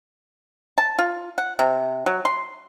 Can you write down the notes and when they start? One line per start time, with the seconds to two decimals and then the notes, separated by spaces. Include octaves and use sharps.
0.78 A5
0.99 F4
1.38 F#5
1.59 C3
2.06 F#3
2.25 C6